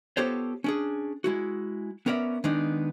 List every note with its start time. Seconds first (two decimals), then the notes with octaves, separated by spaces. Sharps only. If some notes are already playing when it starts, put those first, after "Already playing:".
0.17 B3 F4 G4 A4 C5 C#5
0.64 C#4 D4 G#4
1.24 G#3 E4 F#4
2.06 B3 C#4 A#4 D5 E5
2.44 D#3 G#3 B3 D4 D#4